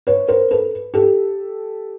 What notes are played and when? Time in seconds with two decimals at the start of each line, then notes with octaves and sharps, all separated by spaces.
0.07 B4 C#5
0.28 A#4 C5
0.51 A4 B4
0.94 G4 A4